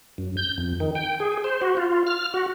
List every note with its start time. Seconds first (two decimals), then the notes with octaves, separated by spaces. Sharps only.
0.18 F#2
0.37 G6
0.58 F2
0.80 D#3
0.95 G5
1.20 G#4
1.44 C5
1.61 F#4
1.77 F4
2.07 F6
2.34 F#4